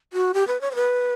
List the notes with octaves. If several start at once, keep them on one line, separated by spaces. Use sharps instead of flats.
F#4
G4
B4
C#5
C5
B4